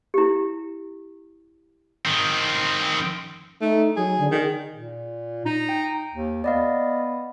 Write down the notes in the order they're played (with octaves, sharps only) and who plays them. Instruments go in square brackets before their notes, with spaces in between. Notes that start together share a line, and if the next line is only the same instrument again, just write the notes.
[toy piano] E4 G4
[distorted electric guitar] D#3 C4
[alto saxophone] A3 [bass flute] D#4
[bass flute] F#3 [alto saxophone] G#4
[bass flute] D3
[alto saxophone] D#3 [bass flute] G#4
[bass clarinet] A#2
D#4
[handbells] G5
[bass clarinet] D#2
[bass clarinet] B3 [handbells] D5 D#5 F5